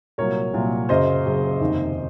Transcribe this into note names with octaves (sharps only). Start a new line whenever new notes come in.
C2 A#2 F#3 A#4 C#5
C2 A#2 F#3
F#1 F#2 C#3 C5 D#5
F#1 F#2 C#3
F1 D#2 D#3